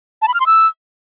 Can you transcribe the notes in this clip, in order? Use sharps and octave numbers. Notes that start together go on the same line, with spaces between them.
A5
B5
F6
C6
E6